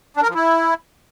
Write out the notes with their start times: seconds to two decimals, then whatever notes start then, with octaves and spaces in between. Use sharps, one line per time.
0.17 D4
0.23 A#4
0.29 F3
0.35 E4